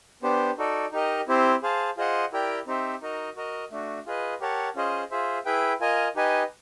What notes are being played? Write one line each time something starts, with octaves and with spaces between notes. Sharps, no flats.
B3 D4 G4 C5
D#4 F#4 A4 D5
D#4 G4 A#4 D#5
C4 E4 G4 C5
G#4 C5 F5 A5
F4 G#4 C5 D#5 F#5
E4 G4 A#4 D5 G5
C4 D#4 G4 C5 E5
D#4 F#4 A#4 D#5
F#4 A#4 D#5
A3 D4 F#4
F4 G#4 B4 D#5
G4 A#4 C#5 F#5 A5
C#4 F4 G#4 C5 D#5
F4 G#4 C5 E5
E4 G#4 B4 E5 G5
F4 A#4 D#5 G#5
D#4 G4 B4 D#5 G#5